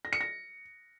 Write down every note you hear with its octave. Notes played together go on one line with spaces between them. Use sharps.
A#6
C#7
A#6